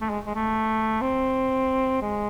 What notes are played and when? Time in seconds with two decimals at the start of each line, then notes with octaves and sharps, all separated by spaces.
0.01 A3
0.10 G#3
0.26 G#3
0.35 A3
1.02 C4
2.02 G#3